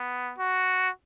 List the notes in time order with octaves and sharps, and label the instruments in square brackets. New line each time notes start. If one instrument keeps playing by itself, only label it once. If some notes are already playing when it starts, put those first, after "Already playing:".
Already playing: [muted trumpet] B3
F#4